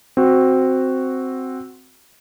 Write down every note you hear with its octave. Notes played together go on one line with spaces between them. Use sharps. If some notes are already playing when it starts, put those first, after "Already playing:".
C4 F#4